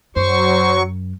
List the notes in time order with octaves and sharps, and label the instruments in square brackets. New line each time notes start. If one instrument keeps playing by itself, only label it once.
[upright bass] F#2 [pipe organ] F#3 C#6 [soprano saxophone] C5